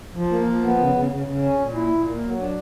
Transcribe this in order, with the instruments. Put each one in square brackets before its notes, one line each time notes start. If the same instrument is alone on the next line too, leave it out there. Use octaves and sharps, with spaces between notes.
[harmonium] F3
A#3
F3
B3
C#3
C#3
C#3
C#3
C#4
A#2
E4
A#2
A#3
F#3
D4